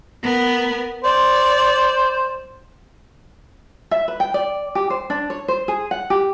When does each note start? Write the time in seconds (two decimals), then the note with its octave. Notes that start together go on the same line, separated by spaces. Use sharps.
0.23 B3 A#4
1.04 C5 D5
3.91 E5
4.08 B4
4.20 G5
4.34 D5
4.75 G4
4.90 C5
5.10 D4
5.30 C#5
5.48 C5
5.68 G#4
5.91 F#5
6.10 G4